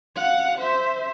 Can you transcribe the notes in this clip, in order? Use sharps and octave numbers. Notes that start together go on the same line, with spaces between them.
F5 F#5
C5 E5